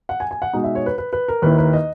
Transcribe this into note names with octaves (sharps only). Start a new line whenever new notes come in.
F#5
G#5
G#5
F#5
B2 G#3 D#4
E5
C#5
B4
B4
B4
A#4
D#2 D#3 A#3 E4 B4
B4
D#5